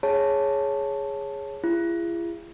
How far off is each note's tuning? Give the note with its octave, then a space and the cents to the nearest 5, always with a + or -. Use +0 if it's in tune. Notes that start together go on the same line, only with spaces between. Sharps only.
G#4 +0 C#5 +0 A5 +0
E4 +45 G#4 -30